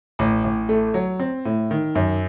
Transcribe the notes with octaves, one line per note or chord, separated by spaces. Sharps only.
A1
A1
A3
F#3
C4
A2
D#3
F#2